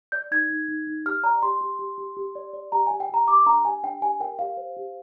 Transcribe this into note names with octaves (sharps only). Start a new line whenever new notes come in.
D5 G6
D#4 G#6
D#4
D#4
D#4
G4 F6
D5 A#5
G4 C6
G4
G4
G4
G4
D5
D5
G4 A#5
G4 G#5
G5
G4 A#5
G4 D6
D4 A#5
G4 G#5
D4 G5
G4 G#5
A#4 G5
G4 F5
C5
G4